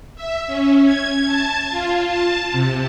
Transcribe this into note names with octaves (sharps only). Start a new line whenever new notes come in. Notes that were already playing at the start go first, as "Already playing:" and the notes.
E5
C#4
G#6
A5
F4
A5
C3